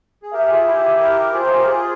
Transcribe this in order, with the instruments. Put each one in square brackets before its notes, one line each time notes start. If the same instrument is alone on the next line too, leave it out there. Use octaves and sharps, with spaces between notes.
[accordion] G#4
[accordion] G4 A#4 [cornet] E5
[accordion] F4 G#4
E4 G4
G4 A#4
[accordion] F4 G#4 [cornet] C5
[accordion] G4 A#4
F4 G#4
G4 A#4
F4 G#4